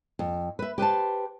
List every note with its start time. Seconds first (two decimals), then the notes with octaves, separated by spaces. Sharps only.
0.19 F2
0.59 B4 E5
0.78 G4 B4 C5 A5